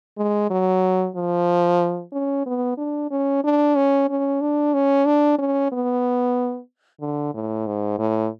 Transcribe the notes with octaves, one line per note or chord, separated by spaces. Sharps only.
G#3
F#3
F3
C#4
B3
D4
C#4
D4
C#4
C#4
D4
C#4
D4
C#4
B3
D3
A2
G#2
A2